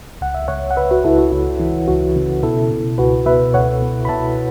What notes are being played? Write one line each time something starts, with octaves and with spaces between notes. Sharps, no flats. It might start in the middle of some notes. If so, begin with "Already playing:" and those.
C#2 F#5
E5
C#2 C#5 F#5
F#5
C#2 B4 E5
F#4 B4
C#2 E4 A4
F#4
C#2 E4
E3
C#2 F#4
C#3
B2 E4 A4
B2
C#2 F#4 B4
B2 B4 E5
C#2 C#5 F#5
B2
B5
B2 E5 A5